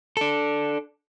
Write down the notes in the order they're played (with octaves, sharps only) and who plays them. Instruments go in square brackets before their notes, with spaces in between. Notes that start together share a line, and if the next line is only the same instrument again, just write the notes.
[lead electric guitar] D4 A4